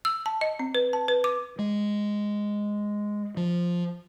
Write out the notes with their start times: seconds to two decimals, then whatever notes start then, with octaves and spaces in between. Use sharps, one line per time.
0.05 E6
0.26 A5
0.41 D#5
0.59 C4
0.75 B4
0.93 A5
1.08 B4
1.24 D6
1.59 G#3
3.37 F3